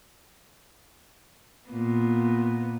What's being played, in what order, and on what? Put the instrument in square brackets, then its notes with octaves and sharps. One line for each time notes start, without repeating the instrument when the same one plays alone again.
[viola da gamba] A#2 B3